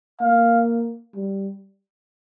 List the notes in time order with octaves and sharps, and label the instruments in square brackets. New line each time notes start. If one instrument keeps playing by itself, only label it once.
[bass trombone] A#3 [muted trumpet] F5
[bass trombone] G3